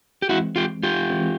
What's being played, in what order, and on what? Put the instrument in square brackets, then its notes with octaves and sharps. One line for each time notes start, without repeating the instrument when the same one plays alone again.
[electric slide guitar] G4
[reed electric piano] E3 G#3 C4 [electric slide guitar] E4 F#4
[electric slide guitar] F4 G4
F4 G4
[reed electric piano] E3 G#3 C4